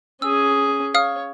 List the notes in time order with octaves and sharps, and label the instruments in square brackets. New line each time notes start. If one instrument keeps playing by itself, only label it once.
[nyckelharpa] C#4 G#4 [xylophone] E6
[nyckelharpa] C#5 [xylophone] F5 D#6 F6